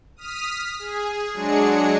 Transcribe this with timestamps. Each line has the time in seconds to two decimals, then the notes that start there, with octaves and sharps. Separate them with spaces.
0.16 D#6 F6 B6
0.79 G#4
1.34 F#3 G#3 D4 G#4 C#7